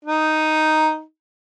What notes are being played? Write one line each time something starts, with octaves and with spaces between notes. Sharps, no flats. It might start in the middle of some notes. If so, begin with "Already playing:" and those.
D#4